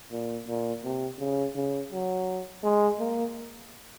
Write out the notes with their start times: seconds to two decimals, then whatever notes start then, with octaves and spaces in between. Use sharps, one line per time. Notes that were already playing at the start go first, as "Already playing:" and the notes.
0.12 A#2
0.48 A#2
0.84 C3
1.19 C#3
1.55 C#3
1.92 F#3
2.64 G#3
2.99 A#3